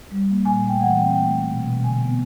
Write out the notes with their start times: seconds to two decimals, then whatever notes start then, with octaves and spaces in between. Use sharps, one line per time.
0.11 G3
0.29 A#3
0.45 A#2 G#5
0.63 A3
0.68 G5
0.80 E3 F#5
0.98 C4 G5
1.14 A3 G5
1.31 A3
1.49 B2
1.66 B2
1.83 D3 G#5
2.01 B3